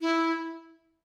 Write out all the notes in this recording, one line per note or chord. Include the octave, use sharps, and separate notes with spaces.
E4